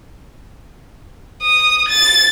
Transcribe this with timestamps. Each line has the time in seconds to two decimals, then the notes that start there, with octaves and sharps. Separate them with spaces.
1.42 D#6
1.89 A6